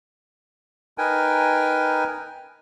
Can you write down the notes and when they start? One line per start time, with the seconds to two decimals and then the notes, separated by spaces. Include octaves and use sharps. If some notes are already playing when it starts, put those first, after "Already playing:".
0.98 D#4 A#4 B4 G5 G#5